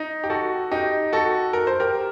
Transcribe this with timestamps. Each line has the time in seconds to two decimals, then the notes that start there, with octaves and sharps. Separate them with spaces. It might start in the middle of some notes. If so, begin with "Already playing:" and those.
Already playing: D#4
0.24 G4
0.30 F#4 A4
0.71 D#4 G4
1.13 F#4 A4
1.53 A#4
1.67 C5
1.80 G4 A#4